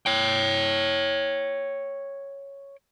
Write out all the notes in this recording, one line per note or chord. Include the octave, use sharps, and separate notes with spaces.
C#5 G5